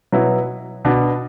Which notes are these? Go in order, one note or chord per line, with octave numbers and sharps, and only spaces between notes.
B2 F#3 B3 E4
B2 B3 D4